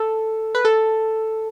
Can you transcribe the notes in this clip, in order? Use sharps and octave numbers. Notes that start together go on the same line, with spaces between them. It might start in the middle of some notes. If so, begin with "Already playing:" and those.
Already playing: A4
B4
A4